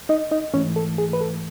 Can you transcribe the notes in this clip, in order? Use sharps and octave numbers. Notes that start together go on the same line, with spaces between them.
D#4 D#5
D#4 D#5
G#2 E3 A3 C#4 C#5
A4
G#4
B4
A4